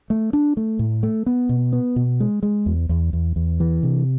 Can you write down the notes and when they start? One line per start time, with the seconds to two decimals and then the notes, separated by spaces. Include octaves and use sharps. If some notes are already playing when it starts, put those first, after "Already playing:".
0.10 A3
0.33 D4
0.57 A3
0.79 A2
1.03 A3
1.26 B3
1.49 B2
1.73 B3
1.96 B2
2.20 G#3
2.43 G#3
2.66 E2
2.89 E2
3.13 E2
3.36 E2
3.60 E3
3.83 C3